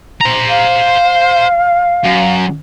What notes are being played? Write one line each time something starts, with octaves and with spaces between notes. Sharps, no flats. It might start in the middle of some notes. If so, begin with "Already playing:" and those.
C5 A#5
F5
F#2